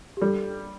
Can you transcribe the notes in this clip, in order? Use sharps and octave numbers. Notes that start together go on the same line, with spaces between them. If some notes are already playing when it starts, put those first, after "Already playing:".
G4
G3 A4